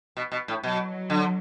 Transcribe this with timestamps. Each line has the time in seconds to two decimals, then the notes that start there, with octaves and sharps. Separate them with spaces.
0.17 B2
0.32 B2
0.48 A2
0.63 B2 F#3
1.10 D3